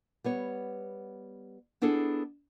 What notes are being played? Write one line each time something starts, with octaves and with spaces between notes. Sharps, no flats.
G3 B3 C#5
B3 D4 E4 G#4 A4